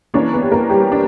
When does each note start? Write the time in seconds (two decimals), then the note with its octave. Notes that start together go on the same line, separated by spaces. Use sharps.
0.14 E3 A#3 C#4 D4 C#5
0.33 B3 B4
0.43 G4
0.52 A#3 A#4
0.69 G3 G4
0.92 D4